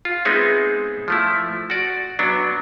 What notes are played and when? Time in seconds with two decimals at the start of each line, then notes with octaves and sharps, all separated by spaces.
0.05 F4
0.25 G#3 B3 C4 D#4 G#4 E5
1.08 F3 A3 E4
1.70 F#4 D5
2.19 F#3 B3 D4